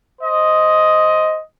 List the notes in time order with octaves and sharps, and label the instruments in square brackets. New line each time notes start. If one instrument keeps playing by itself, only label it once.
[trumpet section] C5 D#5